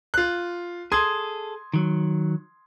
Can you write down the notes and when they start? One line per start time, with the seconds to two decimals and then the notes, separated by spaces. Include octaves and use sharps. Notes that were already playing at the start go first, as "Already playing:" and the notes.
0.14 F4 F#6
0.92 G#4 A4 C6 D#6 G#6
1.74 D#3 F#3